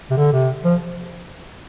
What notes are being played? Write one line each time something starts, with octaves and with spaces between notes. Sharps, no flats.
C3
D3
C3
F3